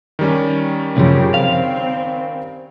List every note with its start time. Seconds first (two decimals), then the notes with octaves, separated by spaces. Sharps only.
0.19 D#3 G3 C#4
0.97 C2 F#2 C#3 F3 G4
1.34 C4 F5